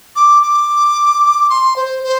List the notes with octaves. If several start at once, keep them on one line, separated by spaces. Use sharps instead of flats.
D6
D6
C6
C5
C5